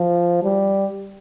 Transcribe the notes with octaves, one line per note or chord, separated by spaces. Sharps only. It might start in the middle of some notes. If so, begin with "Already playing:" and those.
Already playing: F3
G3